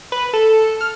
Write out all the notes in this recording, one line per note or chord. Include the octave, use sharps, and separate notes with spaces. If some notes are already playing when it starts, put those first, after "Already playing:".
B4
A4
F6